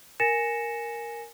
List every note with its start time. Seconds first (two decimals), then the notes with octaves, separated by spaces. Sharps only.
0.20 A#4 G#5 A6 A#6 C#7 E7